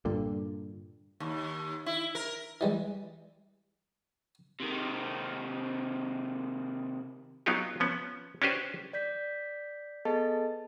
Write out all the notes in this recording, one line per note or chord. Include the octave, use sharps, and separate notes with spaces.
G2 A#2 D3
D#2
E4
A#4
E3 G3 G#3
C3 D#3
F#3 B3 D#4 F4 G4
F3 B3 C#4
C#4 D4 F#4 G4 B4 C5
D5 G6 B6
B3 G#4 A4 D#5 A5